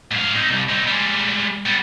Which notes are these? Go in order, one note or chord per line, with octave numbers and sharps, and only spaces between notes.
G#2 F5
C4 D#4
C2
C4 D#4
G3 G#3
G3 B3